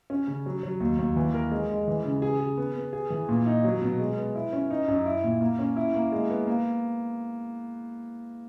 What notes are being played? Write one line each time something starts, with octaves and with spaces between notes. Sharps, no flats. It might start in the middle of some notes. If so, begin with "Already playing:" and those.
C#4
C#3
F#3
F#3
D#2
D#2
E3
A#4
G#3
G#3
E3
C#3
G#4
G#4
B3
B3
G#4
E3
A#2
D#4
F#3
B2
G#3
B3
E4
C#4
D#4
F#2
E4
A#2
A#3
C#4
E4
A#3
G#3
B3
A#3